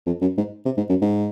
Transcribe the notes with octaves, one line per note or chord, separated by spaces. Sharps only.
F2
F#2
G#2
C3
G#2
F#2
G#2